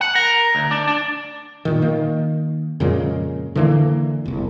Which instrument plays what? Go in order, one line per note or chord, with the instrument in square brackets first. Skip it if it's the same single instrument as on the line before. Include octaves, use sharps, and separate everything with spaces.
[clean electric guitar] F#5
A#4
D2
D4
D4
[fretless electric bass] A#2 D#3
D#3 A#3
F2 A#2 C#3 G#3
D3 E3 A#3
E1 C2